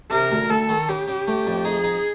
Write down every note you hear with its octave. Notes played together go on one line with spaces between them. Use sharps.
C3 A#4
D2
D2 A4
D#3
C#3 G4
C#3
A3
F2
D#4 G#4
D#4